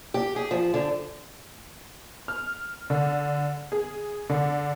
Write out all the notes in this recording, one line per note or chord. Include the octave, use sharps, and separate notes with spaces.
G4
G#4
F3
D3
F6
D3
G#4
D3